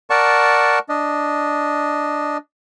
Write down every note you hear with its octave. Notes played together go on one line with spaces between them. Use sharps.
A#4 D5 F#5 A5 C#6
D4 D#5